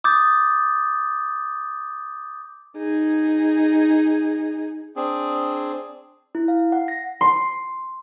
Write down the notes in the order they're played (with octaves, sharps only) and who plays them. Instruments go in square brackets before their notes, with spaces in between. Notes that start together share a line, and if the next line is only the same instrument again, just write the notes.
[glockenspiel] D6 D#6 G6 A6
[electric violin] D#4 G#4
[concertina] C4 D4 G#4
[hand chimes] E4
F5
F#5
A#6
[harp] C6